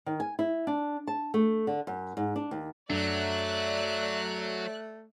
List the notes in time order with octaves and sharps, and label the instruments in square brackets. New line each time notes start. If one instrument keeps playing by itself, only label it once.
[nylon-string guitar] D#3
G#5
E4
D4
A5
A3
D3
F#2
G#2
D4
D#2
[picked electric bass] F#2 D4 [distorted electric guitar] F#3 [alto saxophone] A3 [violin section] D5 E5 F#6